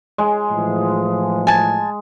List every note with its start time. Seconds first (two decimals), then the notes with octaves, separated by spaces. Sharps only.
0.18 G#3
0.51 A2 E3 F3
1.47 G#5 A5